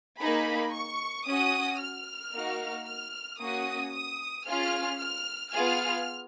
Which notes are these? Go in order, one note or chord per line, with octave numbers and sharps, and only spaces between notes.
A#3 D#4 G#4 B5
C#6
C#4 F#4 D#6
F6
A#3 D#4 F#4
F6
A#3 C#4 F#4 D#6
D#6
C#4 F4 G#4 F6
F6
B3 F4 G#4 F6